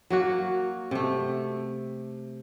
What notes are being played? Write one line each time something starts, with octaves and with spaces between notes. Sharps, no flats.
F#3 A#3 F#4
C3 A3